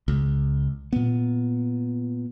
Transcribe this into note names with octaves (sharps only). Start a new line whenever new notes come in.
C#2
A#2 B3